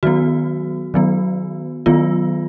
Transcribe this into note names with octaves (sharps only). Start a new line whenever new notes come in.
D#3 F#3 B3 F#4
D#3 F#3 B3
D#3 F#3 B3 F4